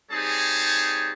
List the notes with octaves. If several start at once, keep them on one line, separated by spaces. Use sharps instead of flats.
G3 C4 D#4 G#4 C#5 A5